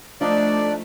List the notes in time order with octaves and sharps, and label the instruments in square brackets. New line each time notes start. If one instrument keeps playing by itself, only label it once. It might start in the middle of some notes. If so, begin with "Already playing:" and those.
[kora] F3 D#4 [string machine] A3 [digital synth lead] D4 [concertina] D5